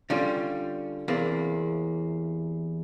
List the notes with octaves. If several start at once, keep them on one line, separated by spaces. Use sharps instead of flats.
D3 G3 C#4 F4
E2 C3 A#3